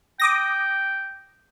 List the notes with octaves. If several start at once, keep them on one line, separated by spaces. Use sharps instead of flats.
G5 D6 D#6 A#6